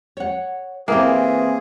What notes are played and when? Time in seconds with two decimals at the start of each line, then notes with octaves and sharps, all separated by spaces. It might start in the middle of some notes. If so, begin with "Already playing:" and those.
0.17 C#5 F#5
0.88 E3 A#3 C4 E4 G4 G#4